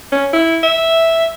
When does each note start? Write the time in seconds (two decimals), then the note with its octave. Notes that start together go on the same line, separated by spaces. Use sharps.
0.12 C#4
0.33 E4
0.63 E5